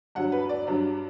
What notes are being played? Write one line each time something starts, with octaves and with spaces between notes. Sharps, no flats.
G2 F#3 F#5
B4
D5
G2 F#3